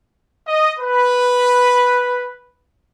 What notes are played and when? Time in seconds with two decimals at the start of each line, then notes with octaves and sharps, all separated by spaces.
0.48 D#5
0.79 B4